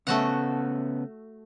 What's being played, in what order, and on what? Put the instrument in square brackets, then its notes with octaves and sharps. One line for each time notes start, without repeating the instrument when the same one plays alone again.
[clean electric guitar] C#3 B3 C#4 [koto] A3 F#4 F#5